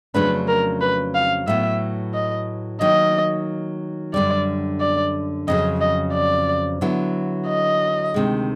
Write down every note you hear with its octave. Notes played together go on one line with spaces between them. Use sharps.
F2 C#3 F#3 A3 D4 B4
A#4
B4
F5
A2 F#3 B3 E5
D#5
D#3 F#3 A#3 D#4 D#5
F#2 D3 G3 D5
D5
F2 C#3 F#3 D#5
D#5
D5
D3 F#3 B3 E4
D#5
D2 C3 D#3 G#3